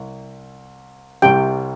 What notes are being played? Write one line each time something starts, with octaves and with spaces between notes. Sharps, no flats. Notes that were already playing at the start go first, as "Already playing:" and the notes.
Already playing: C2
C2 C3 G3 G5